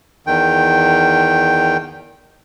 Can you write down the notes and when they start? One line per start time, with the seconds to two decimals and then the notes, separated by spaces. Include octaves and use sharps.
0.27 E2 D#3 G5